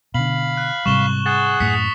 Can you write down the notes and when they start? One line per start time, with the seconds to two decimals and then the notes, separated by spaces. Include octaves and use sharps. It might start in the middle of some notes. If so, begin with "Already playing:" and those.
0.14 B2 D3 F5 B5 F#7
0.57 F#6
0.86 G#2 C3 G3 C#6 E7 G7
1.26 G#4 F#5 F#6 A6
1.60 F#2 A2 D#6 B6 C#7